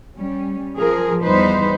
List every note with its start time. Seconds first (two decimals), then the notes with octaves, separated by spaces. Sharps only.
0.18 G3 C#4
0.77 F3 G#4 A#4
1.23 E2 G3 D#4 B4 C5